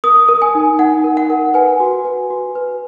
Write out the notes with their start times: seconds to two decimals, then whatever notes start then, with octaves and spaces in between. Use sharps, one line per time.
0.04 A#4 D#6
0.29 A#4
0.42 G#5
0.55 D#4
0.79 D#4 F#5
1.04 A#4
1.17 F#5
1.30 A#4
1.54 B4 G#5
1.80 F#4
2.05 B4
2.30 F#4
2.55 B4